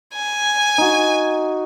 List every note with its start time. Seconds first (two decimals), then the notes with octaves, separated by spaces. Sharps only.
0.14 G#5
0.78 D#4 F#4